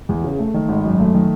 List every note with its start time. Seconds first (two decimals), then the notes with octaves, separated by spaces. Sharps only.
0.09 E2
0.24 C#3
0.39 A3
0.54 D#3
0.69 G#1
0.84 F#2
1.00 A3
1.14 D#3